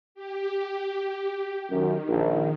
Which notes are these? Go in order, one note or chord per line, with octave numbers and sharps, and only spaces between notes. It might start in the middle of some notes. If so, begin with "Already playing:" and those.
G4
F#2 D#3
A#1